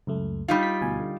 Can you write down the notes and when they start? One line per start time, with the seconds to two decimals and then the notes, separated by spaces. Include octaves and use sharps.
0.07 C#2 F#2 A3
0.48 G3 D#4 F4
0.63 B6
0.81 D2 B2 G#5
1.00 D3